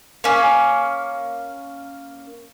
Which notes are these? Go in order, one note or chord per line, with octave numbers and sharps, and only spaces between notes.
A#3 C#4